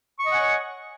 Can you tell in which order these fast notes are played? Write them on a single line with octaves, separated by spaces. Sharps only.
C#6 D#5 F#5 G#5 C#5